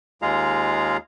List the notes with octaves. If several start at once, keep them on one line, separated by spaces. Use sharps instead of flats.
D#2 G#3 F4 G#4 F5 A#5